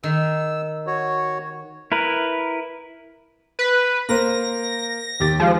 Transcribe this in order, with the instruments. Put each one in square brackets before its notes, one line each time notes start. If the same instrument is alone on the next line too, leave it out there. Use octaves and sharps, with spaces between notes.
[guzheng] D#3 [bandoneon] E6
[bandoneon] F#4 C#5
[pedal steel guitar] E4 A#4 B4
[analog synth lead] B4
[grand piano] A#3 A#4 C5 [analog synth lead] A#6
[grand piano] D#2 G4 A6
[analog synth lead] F3 [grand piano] G#3